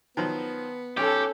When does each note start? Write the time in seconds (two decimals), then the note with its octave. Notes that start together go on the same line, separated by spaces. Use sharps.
0.17 D#3 F3 F#3 B3
0.97 B1 C#4 G4 A4